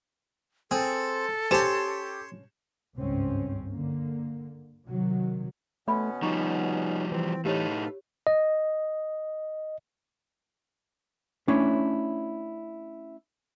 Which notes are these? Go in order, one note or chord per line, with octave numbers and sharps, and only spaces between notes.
C4 G#4 A4
C#4 G4 C5 C#5 A5 C6 E7
G#1 C#2 G2 C4 C#4
D3 A#3
C3 D#3 F#3
B2 A3 B3 C#4 D5 B5 C6
F3 G3 D#4 C#6
E3 C4
A2 D#4 G4 A4 B4 C#5 F5
D#5
A3 C#4 D4 E4 C#5